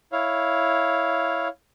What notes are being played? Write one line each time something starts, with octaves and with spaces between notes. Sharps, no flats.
E4 C#5 F5